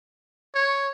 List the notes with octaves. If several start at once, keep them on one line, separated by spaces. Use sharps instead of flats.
C#5